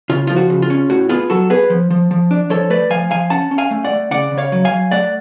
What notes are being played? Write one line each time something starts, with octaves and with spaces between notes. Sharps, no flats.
C#3 F4
F3 F4
F#4
C#3
F4
C#4
A2 F#4
B3 F4 G#4
F#3 F#4 A4
B3 G#4 B4
F3
F3
F3
D4
F3 A4 C#5
A3 B4 D5
F3 F5 G#5
F3 F5 G#5
C#4 F#5 A5
C#4
F5 G#5
A3
D5 F#5
A3
C#3 D5 F#5
C#3
C#5 F5
F#3
F5 G#5
F#3
A3 D5 F#5